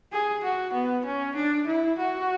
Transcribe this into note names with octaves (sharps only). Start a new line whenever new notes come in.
G#4
F#4
B3
C#4
D4
E4
F#4